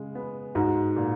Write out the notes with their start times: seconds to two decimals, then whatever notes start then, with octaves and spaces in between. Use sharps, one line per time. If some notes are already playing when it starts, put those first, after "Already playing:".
Already playing: C#3 G#3
0.15 B3
0.55 G#2 F#4
0.96 A#2